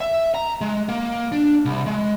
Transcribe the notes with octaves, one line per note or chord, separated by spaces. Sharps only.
E5
A#5
G#3
A#3
D4
C2
G#3